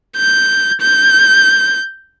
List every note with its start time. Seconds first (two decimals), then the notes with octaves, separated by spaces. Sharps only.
0.17 G6
0.81 G6